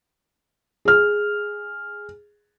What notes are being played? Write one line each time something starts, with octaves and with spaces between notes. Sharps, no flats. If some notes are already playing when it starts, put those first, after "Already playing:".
G#4 F6